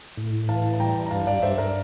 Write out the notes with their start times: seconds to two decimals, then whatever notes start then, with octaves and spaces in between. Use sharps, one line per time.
0.17 A2
0.48 E3 F5 A5
0.74 A5
0.80 G3 G5 A#5
1.06 A#5
1.11 G2 F5 A5
1.27 D5 F5
1.42 G2 C5 E5
1.58 A#4 D5